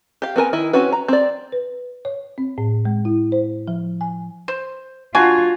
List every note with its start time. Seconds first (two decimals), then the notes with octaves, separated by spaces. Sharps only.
0.22 G4 F5
0.36 B3 C4 A#4 G#5
0.53 D#3 E4
0.73 C4 C#4 F#4 B4
0.92 A#5
1.08 C4 D5
1.52 B4
2.05 C#5
2.38 C4
2.58 A2
2.85 G#3
3.05 E4
3.32 C5
3.68 F3
4.01 G#5
4.48 C5
5.15 D4 F4 F#4 G#5